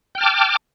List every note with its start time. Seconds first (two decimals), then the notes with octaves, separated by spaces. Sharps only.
0.15 G5
0.18 F6
0.21 A5
0.23 D6